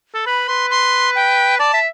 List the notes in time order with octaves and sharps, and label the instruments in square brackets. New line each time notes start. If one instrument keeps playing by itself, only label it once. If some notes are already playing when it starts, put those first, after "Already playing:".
[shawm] A4
[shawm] B4 [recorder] B5
[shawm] B4 [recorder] C6
[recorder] C6
G5
[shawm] D5 [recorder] A5
[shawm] E5